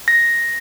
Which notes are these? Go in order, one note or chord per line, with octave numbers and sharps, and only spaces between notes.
A#6